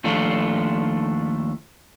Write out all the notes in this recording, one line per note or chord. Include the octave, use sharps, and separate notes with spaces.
D#2 F3 A3 D4 F4